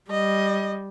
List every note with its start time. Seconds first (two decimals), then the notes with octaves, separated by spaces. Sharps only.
0.11 G3 D#5